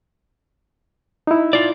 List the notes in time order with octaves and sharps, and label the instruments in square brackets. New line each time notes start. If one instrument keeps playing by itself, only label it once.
[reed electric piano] D#4 E4
[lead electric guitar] F4 D5